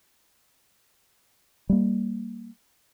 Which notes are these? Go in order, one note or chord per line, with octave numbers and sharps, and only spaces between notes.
G3 A#3